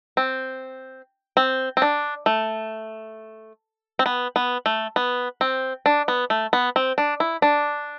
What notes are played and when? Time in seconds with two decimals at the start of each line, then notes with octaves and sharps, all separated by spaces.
0.17 C4
1.37 C4
1.77 C4
1.82 D4
2.26 A3
3.99 C4
4.06 B3
4.36 B3
4.66 A3
4.96 B3
5.41 C4
5.86 D4
6.08 B3
6.30 A3
6.53 B3
6.76 C4
6.98 D4
7.20 E4
7.42 D4